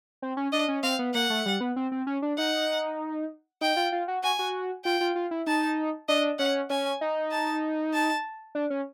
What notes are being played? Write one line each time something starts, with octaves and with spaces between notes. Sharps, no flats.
C4
C#4
D4 D#5
C#4
C4 F5
B3
A#3 F#5
A3
G3
B3
C4
C4
C#4
D4
D#4 F#5
D#4 G5
F4
F4
F#4
F#4 G#5
F#4
F4 G5
F4
F4
E4
D#4 A5
D4 D#5
C#4 F#5
C#4 G#5
D#4
A5
A5
D4
C#4